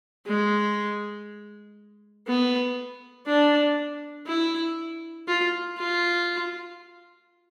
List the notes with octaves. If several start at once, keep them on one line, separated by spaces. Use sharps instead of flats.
G#3
B3
D4
E4
F4
F4